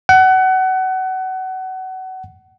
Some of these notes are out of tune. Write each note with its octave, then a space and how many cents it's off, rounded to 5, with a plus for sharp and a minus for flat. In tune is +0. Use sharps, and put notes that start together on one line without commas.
F#5 +25